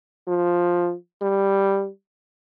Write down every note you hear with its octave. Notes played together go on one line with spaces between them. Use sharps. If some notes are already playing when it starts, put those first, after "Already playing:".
F3
G3